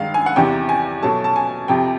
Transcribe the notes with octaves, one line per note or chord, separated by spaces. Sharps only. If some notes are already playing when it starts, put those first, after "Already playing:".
Already playing: G2 D#3 G#3 F5
G#5
F#5
E2 C3 E3 G5
G#5
B2 F#3 A3 A5
A5
G#5
F2 C3 F3 G5